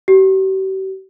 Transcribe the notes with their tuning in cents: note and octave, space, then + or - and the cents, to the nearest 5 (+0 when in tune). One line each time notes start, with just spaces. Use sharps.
G4 -45